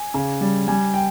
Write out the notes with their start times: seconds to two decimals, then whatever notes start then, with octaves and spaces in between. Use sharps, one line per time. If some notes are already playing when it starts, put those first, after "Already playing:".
Already playing: G#5
0.14 C#3
0.41 G3
0.68 G3 G#5
0.94 G5